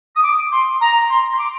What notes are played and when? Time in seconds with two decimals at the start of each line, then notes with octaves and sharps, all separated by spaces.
0.15 D#6
0.22 D6
0.52 C6
0.80 A#5
1.09 C6
1.33 C6
1.38 D6